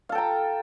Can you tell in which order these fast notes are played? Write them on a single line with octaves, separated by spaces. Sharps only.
F5 A4 G5 A#5